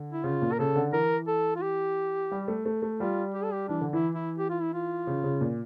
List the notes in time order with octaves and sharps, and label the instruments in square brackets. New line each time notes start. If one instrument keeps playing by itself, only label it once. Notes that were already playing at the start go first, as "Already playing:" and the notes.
Already playing: [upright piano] D3
[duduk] E4
[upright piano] C#3 [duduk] F4
[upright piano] A#2
[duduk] A#4
[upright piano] C#3 [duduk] A4
[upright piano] D3
[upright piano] E3 [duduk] A#4
[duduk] A4
F4
G4
[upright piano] G3
A3
A3
A3
[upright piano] G3 [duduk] F4
[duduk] G4
A4
G4
[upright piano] E3 [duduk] D4
[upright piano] D3
[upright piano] E3 [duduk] E4
[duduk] E4
G4
F4
E4
F4
[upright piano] C#3
C#3
A#2